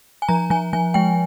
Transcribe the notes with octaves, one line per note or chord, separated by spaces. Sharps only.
G#5
F3 A#5
F3 G#5
F3 G#5
G#3 G5